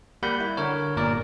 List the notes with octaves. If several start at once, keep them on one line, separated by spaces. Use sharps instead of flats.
G3 A#3 F#5 B5 G6
E4
D3 A#4 C#5
G1 A#2 A#4 D5